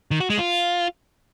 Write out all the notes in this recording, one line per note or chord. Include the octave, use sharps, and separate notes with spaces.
D#3
F#4
G#3
F4